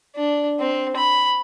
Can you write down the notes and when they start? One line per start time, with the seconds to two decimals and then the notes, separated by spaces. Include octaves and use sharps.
0.16 D4
0.60 C4
0.97 B5